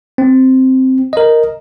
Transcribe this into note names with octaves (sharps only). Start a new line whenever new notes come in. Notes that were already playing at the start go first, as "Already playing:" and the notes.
C4
A#4 D#5